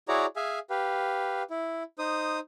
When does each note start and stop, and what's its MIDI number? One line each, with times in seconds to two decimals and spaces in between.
0.08 0.26 64
0.08 0.26 66
0.08 0.26 68
0.08 0.26 73
0.08 0.26 74
0.08 0.26 82
0.36 0.59 68
0.36 0.59 76
0.36 0.59 77
0.36 0.59 80
0.70 1.43 67
0.70 1.43 71
0.70 1.43 77
1.50 1.83 64
1.99 2.39 63
1.99 2.39 72
1.99 2.39 87